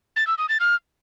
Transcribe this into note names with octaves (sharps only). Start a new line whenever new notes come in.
A6
E6
D#6
A6
F6